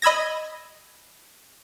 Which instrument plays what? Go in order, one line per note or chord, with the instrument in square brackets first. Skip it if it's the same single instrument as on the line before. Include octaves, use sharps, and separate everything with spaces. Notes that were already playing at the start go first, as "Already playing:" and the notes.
[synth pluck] D#5 B5 E6 G#6 A#6